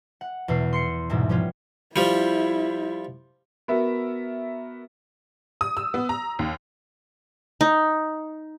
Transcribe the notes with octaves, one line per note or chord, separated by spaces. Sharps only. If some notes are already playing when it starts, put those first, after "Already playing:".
F#5
E2 B2 B3 C7
C6 C7 C#7
C2 G#2 B2 E3
F3 G3 B3 C#4 F4
F3 G3 E4
B3 F#4 A#4 E5
D#6
E6
B3
A#5
D#2
D#4